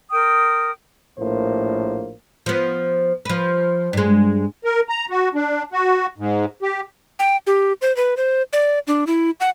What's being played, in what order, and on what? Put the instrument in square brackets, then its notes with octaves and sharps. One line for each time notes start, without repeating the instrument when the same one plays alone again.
[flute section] A#4 G5 D#6
[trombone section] A#1 A2 A#3 C5
[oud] F3 B3
F3 B4
G2 G#3
[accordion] A#4
A#5
F#4
D4
F#4
G#2
G4
[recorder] G5
G4
C5
B4
C5
D5
D4
E4
F#5